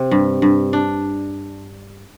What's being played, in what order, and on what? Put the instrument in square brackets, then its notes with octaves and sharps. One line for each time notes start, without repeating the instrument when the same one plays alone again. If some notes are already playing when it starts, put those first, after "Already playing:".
Already playing: [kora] C3
G2
G2
D4